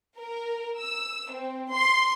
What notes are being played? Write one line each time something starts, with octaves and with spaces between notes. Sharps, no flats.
A#4
E6
C4
C6